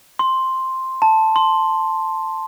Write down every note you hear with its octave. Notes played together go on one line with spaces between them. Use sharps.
C6
A5
C6